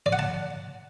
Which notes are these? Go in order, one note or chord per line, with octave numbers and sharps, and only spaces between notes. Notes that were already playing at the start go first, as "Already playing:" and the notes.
D5
F#5
A5